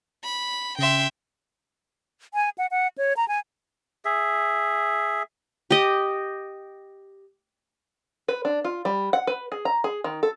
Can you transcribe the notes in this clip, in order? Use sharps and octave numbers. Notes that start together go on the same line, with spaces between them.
B5
C#3 E5 G5 C6
G#5
F#5
F#5
C#5
A#5
G#5
G#4 E5
G4 D#5
B4
D4
F4
G3
F#5
B4
G#4
A#5
G#4
D#3
A4